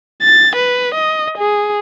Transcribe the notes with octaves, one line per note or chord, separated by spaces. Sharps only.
A6
B4
D#5
G#4